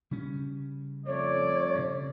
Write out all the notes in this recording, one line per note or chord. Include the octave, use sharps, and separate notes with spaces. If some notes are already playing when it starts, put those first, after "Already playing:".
C#3 G3 C#4
F2 A3 C#5 D5
G2 C#3